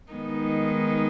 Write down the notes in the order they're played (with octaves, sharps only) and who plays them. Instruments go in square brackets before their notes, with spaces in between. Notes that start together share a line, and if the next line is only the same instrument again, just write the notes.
[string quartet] D#3 G#3 B3 D#4